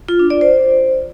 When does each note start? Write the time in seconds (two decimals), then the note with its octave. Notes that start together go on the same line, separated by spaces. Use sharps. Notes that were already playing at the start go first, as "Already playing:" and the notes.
0.09 F4
0.19 D4
0.30 D5
0.41 C5